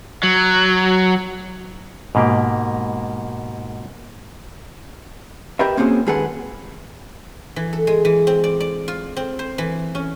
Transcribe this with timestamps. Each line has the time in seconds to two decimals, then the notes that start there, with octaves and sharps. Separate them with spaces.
0.23 F#3
2.15 G#2 B2 A#3 G4
5.59 G4 A#4 B4 D#5 E5
5.77 A#3 C4 C#4 F#4 G#4 C5
6.07 D#2 G#3 G#4 A4 B4 F#5
7.56 E3
7.73 A4
7.87 G#3
8.05 E3
8.27 C4
8.44 D5
8.60 D5
8.88 F4
9.17 C4
9.39 C5
9.58 E3
9.95 C#4